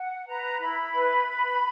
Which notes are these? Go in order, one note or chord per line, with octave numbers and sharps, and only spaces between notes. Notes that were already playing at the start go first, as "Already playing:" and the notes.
Already playing: F#5
B4 A#5
E4 B5
B4
B4